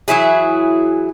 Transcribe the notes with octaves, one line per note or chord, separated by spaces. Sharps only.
E3 F#3 E4 G#4